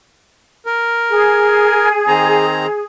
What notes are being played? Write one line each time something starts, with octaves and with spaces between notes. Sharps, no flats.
A#4
G#4
D#3 C4 A#5